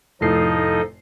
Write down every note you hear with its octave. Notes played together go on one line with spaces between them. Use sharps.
F1 A2 F3 D#4 A4 D#5 C7